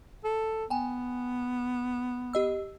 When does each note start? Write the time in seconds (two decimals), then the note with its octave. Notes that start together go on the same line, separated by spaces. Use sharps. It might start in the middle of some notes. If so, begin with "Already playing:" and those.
0.24 A4
0.70 B3 G5 G#5
2.33 G4 D#5 E6